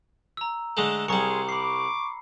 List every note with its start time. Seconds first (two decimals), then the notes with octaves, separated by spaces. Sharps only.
0.37 A#5 E6
0.77 D3 G#3 A3
1.08 C2 G3 G#4 A#5 C6 C#6 C#7
1.49 B5 C#6 D6 C7